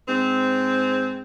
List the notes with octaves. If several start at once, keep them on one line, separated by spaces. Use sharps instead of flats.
G#2 C4